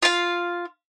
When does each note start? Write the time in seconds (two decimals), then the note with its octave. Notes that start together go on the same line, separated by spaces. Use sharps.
0.03 F4 F5